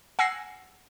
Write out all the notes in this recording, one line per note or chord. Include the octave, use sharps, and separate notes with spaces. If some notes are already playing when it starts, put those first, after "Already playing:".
F#5 G#5 E6 A#6 C7 C#7